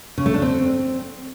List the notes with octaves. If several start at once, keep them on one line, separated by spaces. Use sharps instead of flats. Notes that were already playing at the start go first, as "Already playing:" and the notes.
C#3
A3
D4
C4